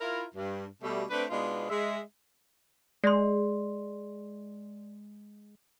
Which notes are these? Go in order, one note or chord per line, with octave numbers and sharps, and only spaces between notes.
E4 F4 A#4
G2
B2 G3 A3
A3 C4 D4 B4
B2 G#3 B3 D4 D#4 F4
G#3 E5
G#3 D5 C6